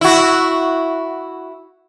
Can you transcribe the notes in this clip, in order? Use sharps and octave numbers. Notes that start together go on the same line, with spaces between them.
E4 F#4